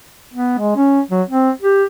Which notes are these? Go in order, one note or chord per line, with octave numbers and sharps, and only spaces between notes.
B3
G#3
C#4
F#3
C4
G4